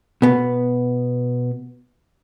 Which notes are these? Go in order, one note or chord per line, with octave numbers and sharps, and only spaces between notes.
B2 B3